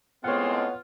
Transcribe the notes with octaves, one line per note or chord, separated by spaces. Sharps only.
A2 G#3 B3 C4 F4 C#5 F#5